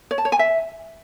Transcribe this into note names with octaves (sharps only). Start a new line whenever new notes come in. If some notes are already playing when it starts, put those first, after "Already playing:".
C#5
A5
C#5
G#5
E5